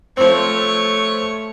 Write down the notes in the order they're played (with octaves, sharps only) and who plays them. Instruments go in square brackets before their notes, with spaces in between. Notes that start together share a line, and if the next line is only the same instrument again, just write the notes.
[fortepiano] F3 C4 [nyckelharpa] A3 C#5